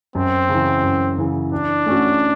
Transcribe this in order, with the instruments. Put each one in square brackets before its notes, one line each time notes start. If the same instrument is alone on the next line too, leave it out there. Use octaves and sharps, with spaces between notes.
[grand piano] F#2 [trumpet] C4
[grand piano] C#3 E3
F#2
C#3 E3
[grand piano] E3 [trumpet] D4
[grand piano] A3 C#4 F#4